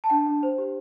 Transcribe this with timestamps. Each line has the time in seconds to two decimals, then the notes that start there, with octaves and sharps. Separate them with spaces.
0.04 A5
0.10 D4 G5
0.26 D4
0.43 C5
0.58 G4